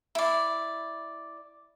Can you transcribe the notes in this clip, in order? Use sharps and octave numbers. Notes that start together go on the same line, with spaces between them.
E4 D5